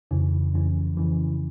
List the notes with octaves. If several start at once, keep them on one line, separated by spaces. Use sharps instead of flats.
F2 C#3 E3
F2 C#3 E3
F2 C#3 E3